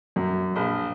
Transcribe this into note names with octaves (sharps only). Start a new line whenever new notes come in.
F#2
A#1